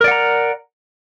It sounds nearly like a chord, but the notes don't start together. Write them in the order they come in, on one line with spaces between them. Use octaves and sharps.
A#4 D5 F#5 A#5